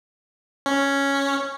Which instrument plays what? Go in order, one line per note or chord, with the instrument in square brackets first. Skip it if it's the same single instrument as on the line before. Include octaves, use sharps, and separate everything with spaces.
[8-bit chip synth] C#4